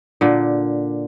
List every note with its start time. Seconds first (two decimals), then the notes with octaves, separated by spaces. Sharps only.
0.21 A#2 D3